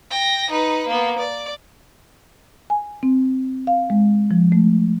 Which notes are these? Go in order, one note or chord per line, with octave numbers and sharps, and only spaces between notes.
G5 A#6
D#4 B4
A#3 B3
D5
G#5
C4
F5
G#3
F3
A3